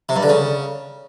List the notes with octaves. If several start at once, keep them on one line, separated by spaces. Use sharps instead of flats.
C3
G2
D3
C#3